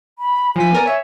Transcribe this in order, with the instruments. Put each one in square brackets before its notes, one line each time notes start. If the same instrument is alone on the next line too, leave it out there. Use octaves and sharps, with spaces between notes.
[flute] B5
[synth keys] F3 B6 [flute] G#5
[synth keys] B3 A#4 D5
C#5 E5